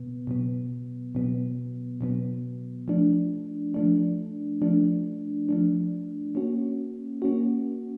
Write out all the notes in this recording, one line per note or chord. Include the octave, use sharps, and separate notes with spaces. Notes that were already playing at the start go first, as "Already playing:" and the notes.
Already playing: B2 B3
B2 F#3 B3
B2 F#3 B3
B2 F#3 B3
F3 A3 D4
F3 A3 D4
F3 A3 D4
F3 A3 D4
A#3 C#4 F#4
A#3 C#4 F#4